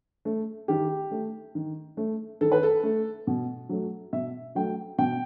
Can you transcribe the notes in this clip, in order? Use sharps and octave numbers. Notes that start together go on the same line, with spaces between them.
A3
D#3 G4
A3
D#3
A3
D#3 A4
B4
A4
A3
B2
F#3 A3
B2 E5
F#3 A3 G5
B2 G5